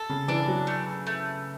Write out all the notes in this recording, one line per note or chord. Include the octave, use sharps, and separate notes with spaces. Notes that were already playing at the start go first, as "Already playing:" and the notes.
Already playing: A4
C#3
E3 D4
F#3
A3
A3